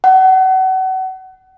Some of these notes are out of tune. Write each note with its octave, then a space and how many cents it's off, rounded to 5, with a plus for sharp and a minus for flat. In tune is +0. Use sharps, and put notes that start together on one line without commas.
F#5 +30